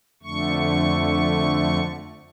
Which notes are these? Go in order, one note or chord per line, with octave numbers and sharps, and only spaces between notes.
F2 D3 A3 C#6